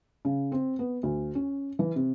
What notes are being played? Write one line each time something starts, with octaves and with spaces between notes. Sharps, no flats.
C#3
C4
B3
D2
C#4
E3
C3